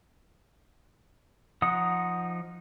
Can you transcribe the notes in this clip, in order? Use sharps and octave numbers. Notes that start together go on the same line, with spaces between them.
F3 D#4 F#5 D#6